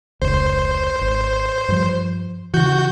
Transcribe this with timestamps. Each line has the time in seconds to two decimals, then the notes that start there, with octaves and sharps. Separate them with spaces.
0.22 F1 C#2 C5
1.01 G#1
1.69 G2 F3
2.54 C#3 E3 F#4 G6